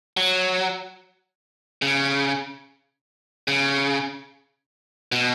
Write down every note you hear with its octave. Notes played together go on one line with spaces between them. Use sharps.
F#3
C#3
C#3
B2